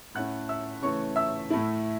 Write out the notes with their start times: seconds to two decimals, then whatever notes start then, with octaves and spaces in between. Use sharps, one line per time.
0.15 A2 A3 C#4 E4 F#5 F#6
0.49 E5 E6
0.82 C#3 E3 A3 C#5 C#6
1.16 E5 E6
1.50 A2 A3 E4